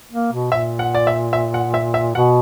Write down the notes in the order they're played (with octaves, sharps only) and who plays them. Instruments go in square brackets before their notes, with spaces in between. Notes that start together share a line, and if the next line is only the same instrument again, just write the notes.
[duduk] A#3
B2
[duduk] A#2 [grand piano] E5
[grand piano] F#5
D5
E5
E5
F#5
E5
E5
[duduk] B2 [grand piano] F#5